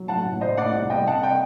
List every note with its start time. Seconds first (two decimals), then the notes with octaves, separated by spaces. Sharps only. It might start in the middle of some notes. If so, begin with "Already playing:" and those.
Already playing: F#3
0.08 A2 F#5 A5
0.25 A1
0.41 A2 C5 D#5
0.57 A2 D5 F#5
0.74 C2
0.90 C2 D#5 G5
1.07 C3 F#5 A5
1.23 D#5 G5